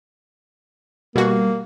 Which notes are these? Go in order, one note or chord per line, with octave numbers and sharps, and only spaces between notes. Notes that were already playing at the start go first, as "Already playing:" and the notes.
B2 G3 A#3 F#4